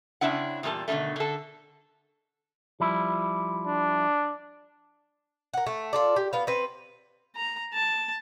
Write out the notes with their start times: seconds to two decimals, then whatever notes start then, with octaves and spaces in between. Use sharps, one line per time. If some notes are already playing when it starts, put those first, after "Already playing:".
0.21 C#3 G3 C4 D4 E4 F#5
0.63 E2 A#2 G3 E4 A4 A5
0.88 B2 D3 D#3 G3 A3
1.16 D3 A4
2.80 F3 G3 E4
3.66 D4
5.54 A#4 F#5
5.66 A3
5.93 F4 A4 D5
6.16 G4
6.33 B3 F5
6.47 C4 B4
7.35 A#5
7.74 A5